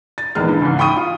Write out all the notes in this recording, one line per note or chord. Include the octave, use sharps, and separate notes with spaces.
A6
D#1 E2 D#3 G#3 B4 F6
G2
C#2 G#2
G5 B5 C#6 D#6 D#7
F4